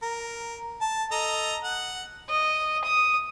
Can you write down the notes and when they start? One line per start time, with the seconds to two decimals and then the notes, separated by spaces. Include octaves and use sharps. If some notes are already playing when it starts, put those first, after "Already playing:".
0.02 A#4
0.81 A5
1.12 A4 D#5 A#5
1.64 F#5
2.29 D#5
2.84 D#6